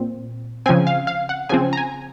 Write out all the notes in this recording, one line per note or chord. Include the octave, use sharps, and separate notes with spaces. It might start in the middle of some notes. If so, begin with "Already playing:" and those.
Already playing: A#2 C4
C#3 F3 C4 G#5
F5
F5
F#5
C#3 F3 C4 G#5
A#5
G#5